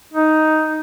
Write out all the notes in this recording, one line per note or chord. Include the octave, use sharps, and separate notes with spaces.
D#4